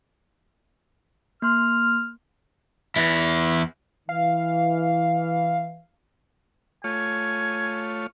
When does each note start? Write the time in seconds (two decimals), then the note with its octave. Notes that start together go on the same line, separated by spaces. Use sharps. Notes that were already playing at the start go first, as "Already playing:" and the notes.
1.42 A#3 C6 F6
2.96 E2 E4
4.09 E3 F5
6.84 A3 F4 C#5 G#5